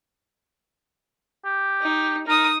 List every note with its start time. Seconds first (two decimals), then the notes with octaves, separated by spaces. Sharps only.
1.45 G4
1.82 D#4
2.28 D#4 A#4 D#6